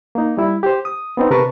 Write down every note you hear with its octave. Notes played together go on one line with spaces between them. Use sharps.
A#3 D#4
G3 E4
G4 C5
D#6
B3 C4 D#4
C3 A#4 B4 A5 C#6